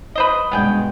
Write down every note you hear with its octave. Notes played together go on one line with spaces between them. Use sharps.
B4 C5 D#5
G2 B2 G#3 B3 G#4 G5